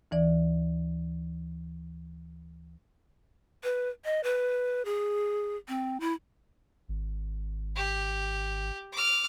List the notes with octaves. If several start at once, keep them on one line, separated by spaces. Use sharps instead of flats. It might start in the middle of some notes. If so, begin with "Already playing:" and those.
D2 E3 D5
B4
D#5
B4
G#4
C4
E4
G#1
G4
D6 F6